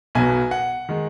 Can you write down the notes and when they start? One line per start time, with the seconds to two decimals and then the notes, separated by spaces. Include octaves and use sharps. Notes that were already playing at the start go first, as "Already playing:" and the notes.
0.15 B1 B2 F#3 B3 G#5
0.51 F#5
0.89 D#3 G#3